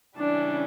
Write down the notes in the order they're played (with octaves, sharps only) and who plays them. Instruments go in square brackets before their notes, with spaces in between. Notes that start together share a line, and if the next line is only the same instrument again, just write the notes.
[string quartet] C#3 E3 G3 C#4 [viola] D4